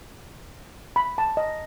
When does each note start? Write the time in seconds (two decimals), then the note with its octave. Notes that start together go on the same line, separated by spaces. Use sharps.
0.96 B5
1.18 A5
1.37 D#5